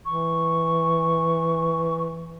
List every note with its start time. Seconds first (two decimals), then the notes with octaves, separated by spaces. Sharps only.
0.05 E3 C#6